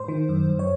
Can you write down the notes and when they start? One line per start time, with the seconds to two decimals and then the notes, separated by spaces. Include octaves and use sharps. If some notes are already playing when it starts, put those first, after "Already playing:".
Already playing: G#2 C5
0.08 D#3
0.29 F#2
0.49 F#2
0.59 C#5